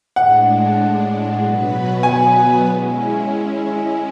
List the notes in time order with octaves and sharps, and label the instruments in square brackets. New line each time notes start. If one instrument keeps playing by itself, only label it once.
[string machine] A2 G#3 D4 [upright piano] F#5
[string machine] B2 F#3 B3 F#4 B4
[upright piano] G#5
[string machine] G#3 C#4 E4